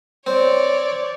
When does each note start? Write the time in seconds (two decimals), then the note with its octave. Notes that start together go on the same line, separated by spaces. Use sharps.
0.26 C4 C#5 D5